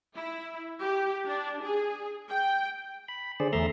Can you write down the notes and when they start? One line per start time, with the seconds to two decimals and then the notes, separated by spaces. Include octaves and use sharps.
0.14 E4
0.79 G4
1.27 D4
1.64 G#4
2.30 G5
3.08 B5
3.40 D3 G#4 C5 D5
3.53 E2 A3 E5 A#5 C6